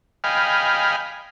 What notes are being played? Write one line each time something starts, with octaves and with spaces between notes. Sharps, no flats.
D#5 F5 G5 G#5 B5 F6